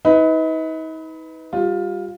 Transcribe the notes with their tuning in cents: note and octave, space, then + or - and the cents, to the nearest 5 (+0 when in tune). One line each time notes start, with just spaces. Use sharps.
D#4 +40 B4 +10
G3 +0 F4 +15